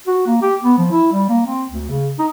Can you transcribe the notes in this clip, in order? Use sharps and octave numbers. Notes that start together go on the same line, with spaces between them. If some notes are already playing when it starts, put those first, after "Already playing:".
F#4
A#3
G4
B3
F3
E4
G3
A#3
C4
D2
C#3
D#4